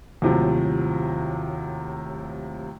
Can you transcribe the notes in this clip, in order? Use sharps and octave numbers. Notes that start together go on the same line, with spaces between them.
D#2 A2 C3 F3 F#3